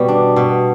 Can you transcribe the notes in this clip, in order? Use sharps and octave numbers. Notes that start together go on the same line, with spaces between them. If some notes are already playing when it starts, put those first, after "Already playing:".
Already playing: B2 G3
D4
B2